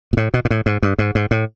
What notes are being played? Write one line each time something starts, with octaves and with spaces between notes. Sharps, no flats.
A#2
A2
B2
A#2
A2
G#2
G2
G#2
G#2
A2